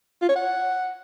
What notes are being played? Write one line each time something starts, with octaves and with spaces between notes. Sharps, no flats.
F4
C#5
F#5